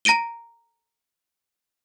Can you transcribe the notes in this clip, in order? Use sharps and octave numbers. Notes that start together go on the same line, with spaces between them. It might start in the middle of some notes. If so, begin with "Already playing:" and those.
A#5 A#6 D7 D#7 G7